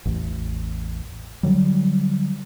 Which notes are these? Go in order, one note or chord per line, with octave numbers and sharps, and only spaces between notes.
A1 E2
D3 F#3 G3